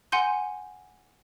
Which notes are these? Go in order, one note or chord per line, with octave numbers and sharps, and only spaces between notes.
F#5 G#5 C6 G6